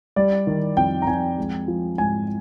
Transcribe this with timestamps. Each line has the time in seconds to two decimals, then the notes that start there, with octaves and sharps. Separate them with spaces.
0.16 G3 D5
0.47 D#3
0.77 F2 G5
1.02 A#5
1.07 F2 G#5
1.38 G#3
1.68 F3
1.98 G#2 G#5